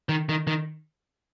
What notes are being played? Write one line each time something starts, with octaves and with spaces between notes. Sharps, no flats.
D#3
D#3
D#3